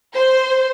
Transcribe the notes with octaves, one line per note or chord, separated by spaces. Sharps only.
C5